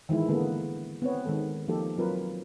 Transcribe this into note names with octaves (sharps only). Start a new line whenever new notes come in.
D#3 E3 G#3 E4
D3 G#3 A#3 B3 A4
B3 C4 C#5
D#3 G#3 A4
F3 A#3 D#4 G4 A4
F#3 C4 F4 A#4 B4